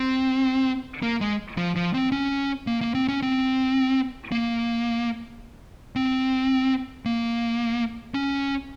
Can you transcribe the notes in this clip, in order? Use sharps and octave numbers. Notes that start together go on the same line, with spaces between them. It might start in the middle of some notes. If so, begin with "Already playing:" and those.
Already playing: C4
A#3
G#3
F3
F3
C4
C#4
A#3
A#3
C4
C#4
C4
A#3
C4
A#3
C#4